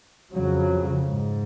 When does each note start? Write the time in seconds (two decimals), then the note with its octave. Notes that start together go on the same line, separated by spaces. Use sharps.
0.32 F2 C#3 F#3
1.08 G#2